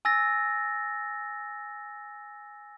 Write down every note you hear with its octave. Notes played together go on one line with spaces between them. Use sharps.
G#5 E6 A6 A#6